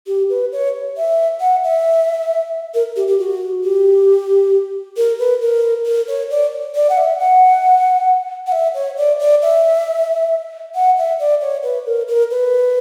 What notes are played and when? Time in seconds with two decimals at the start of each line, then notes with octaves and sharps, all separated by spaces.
0.07 G4
0.30 B4
0.52 C#5
0.97 E5
1.40 F#5
1.64 E5
2.74 A#4
2.96 G4
3.07 G4
3.19 F#4
3.63 G4
4.97 A#4
5.19 B4
5.41 A#4
5.86 A#4
6.08 C#5
6.30 D5
6.75 D5
6.90 F#5
6.97 E5
7.19 F#5
8.47 F#5
8.52 E5
8.75 C#5
8.97 D5
9.20 D5
9.42 E5
10.75 F#5
10.98 E5
11.19 D5
11.41 C#5
11.63 B4
11.86 A#4
12.08 A#4
12.31 B4